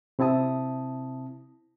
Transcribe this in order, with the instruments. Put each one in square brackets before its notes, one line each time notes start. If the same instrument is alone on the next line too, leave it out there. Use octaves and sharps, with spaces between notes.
[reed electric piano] C3 C4 E4 A5 D#6